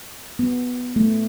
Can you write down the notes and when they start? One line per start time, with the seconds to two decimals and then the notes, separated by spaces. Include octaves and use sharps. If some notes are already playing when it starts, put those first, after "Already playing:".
0.39 B3
0.96 A3